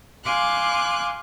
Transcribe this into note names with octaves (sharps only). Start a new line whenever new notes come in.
F5 G#5 C6 D6 F#6